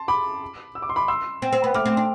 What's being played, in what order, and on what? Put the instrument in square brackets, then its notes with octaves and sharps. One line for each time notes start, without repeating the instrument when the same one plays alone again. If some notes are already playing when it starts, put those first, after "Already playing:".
Already playing: [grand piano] A5 C6
B5 D6
E6
D6
C6
B5 D6
C6 E6
[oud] C4
C4
B3
[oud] A3 [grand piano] D6 F6
[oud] C4
D4